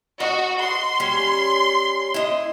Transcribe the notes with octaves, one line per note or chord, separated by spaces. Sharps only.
F#4 D#5
C6
G3 C#4
E4 D#5